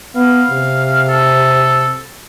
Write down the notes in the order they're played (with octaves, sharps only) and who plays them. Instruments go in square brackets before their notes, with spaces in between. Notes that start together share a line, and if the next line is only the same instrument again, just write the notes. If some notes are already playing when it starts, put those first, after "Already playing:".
[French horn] B3 [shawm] F5
[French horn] C3
[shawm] A4